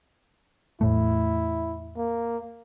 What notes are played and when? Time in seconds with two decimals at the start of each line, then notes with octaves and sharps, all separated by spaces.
0.81 E2 A2 A3 E4
1.97 A#3